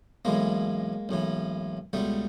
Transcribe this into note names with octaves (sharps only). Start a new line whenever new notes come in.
B1 A2 E3 G#3 A#3
B1 A2 E3
C#2 B2 G3 A3